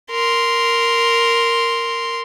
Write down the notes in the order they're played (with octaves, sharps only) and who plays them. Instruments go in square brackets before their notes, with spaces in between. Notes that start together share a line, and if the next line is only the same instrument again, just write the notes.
[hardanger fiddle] A#4 C6